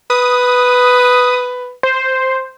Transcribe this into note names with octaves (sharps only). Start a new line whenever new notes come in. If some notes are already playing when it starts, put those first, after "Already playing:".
B4 D#6
C5